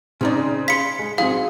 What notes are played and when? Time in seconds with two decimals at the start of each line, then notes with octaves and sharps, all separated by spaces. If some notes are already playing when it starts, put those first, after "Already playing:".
0.21 C#3 C4 C#4 D#4 D5
0.68 F5 B5 C6 B6 C#7
0.99 G#3
1.18 G#2 F#3 C4 G#4 F5